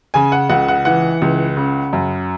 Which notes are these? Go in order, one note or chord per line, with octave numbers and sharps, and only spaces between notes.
C#3 G#5
F#5
C#2 F#5
F#5
E3 F#5
C#2
C#3
F#2